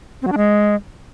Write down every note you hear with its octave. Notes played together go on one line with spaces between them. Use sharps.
C4
F#3
D4
G#3